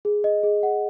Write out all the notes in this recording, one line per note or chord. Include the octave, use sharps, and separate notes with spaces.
G#4
D#5
G#4
F#5